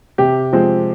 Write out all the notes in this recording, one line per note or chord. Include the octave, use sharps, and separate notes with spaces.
C3 G4
F3 G#3 C4